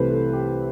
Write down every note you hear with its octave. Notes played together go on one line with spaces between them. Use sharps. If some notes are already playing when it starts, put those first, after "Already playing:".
Already playing: C2 C3 E3 A3 B4 C5
A4
G4